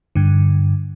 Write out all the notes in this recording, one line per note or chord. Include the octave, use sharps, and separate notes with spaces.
G2 D3